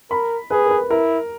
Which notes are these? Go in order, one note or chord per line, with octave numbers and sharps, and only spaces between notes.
A#4 B5
G#4 B4
A#4
B4
E4 A#4